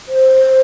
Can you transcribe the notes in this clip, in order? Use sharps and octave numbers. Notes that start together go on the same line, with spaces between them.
C5